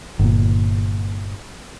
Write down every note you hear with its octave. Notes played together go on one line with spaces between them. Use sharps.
G1 A#2